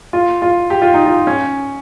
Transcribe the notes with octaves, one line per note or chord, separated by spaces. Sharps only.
F4
F4
G4
F4
D#4
F4
C#4